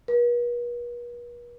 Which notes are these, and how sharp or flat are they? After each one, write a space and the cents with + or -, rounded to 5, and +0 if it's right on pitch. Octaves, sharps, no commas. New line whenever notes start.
B4 -45